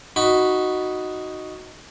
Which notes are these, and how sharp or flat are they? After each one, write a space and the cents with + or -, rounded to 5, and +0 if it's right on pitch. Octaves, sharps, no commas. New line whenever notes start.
D#4 +0 F#4 +0 B5 +0